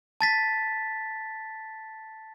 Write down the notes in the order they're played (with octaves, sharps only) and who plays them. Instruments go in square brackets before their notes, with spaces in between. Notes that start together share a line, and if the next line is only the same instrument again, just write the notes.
[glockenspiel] A5 A6 B6